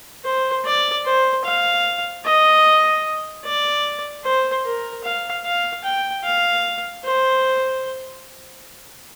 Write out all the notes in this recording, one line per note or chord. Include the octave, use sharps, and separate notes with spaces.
C5
D5
C5
F5
D#5
D5
C5
A#4
F5
F5
G5
F5
C5